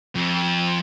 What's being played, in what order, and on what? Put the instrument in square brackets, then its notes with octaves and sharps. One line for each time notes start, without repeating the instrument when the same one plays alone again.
[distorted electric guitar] F2